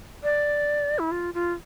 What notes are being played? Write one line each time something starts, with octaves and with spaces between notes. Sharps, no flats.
D5
E4
F4
F4